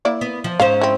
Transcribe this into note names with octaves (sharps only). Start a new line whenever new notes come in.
A#3 E4 D5
B3
F3
G#2 C#4 C5 F5
C4 E4